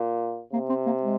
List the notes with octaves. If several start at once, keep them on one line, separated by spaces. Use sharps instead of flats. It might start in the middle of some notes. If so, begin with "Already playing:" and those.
Already playing: A#2
C3 A#3
C4
A#3
G#3